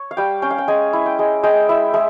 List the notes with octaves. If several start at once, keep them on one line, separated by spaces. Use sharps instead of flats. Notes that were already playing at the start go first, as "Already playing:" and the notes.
Already playing: C#5
F5
G3 G5
C#4 G5
F5
G5
G#3 G#5
E4
G5
G#3
G#3 G5
E4 E5
G#3 E5